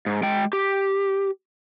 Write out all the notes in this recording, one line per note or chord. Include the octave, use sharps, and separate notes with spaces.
G#2
G#3 G5
G4